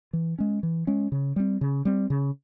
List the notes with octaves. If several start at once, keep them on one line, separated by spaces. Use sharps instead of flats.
E3
G#3 C#4
E3
G#3 C#4
C#3
G3 C4
C#3
G3 C4
C#3